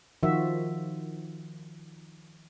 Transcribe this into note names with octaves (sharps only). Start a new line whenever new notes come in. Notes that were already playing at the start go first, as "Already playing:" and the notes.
D#3 F3 F4 F#4 E5